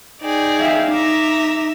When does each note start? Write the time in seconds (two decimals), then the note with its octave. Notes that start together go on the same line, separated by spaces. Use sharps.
0.22 D#4 G#4 D5 G5
0.60 E5 F5
0.93 D#4 E5 A#5 D6